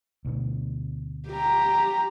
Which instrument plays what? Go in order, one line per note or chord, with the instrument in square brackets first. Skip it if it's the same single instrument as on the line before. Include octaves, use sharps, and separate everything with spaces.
[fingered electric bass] D2 B2 A3
[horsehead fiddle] G4 A#5